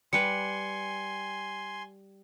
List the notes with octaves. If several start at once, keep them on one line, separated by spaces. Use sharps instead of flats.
G3 B4 G#5 C6 C#7